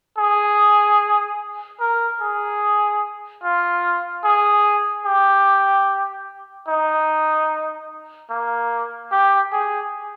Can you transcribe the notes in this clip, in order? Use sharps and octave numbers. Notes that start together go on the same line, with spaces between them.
G#4
A#4
G#4
F4
G#4
G4
D#4
A#3
G4
G#4